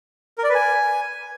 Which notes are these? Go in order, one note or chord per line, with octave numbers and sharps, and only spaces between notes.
A#4
D5
B4
G#5